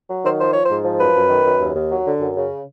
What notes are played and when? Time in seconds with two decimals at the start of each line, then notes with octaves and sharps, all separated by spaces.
0.09 F#3
0.24 D#3 C5
0.39 F3 C5
0.52 F3 C#5
0.65 G#2 C5
0.84 F3
0.99 F#2 B4
1.15 F#2
1.29 D#3
1.45 F#2
1.60 D#2
1.75 D#2
1.90 F#3
2.05 D3
2.20 F#2
2.35 C#3